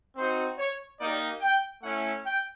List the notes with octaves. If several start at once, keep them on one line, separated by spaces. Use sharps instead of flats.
C4 D#4 F#4 C5
C#5
A#3 D#4 G4 D5
G5
A3 C#4 E4 F#5
G5